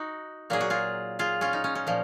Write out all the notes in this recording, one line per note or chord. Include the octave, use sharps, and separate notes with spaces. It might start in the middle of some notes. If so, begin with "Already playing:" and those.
Already playing: D#4 F#4
A#2 F#3 A#3 G#4
F#4
F4 G#4
F4 G#4
C#4 F4
D#4
C#4
C#4
A#2 F3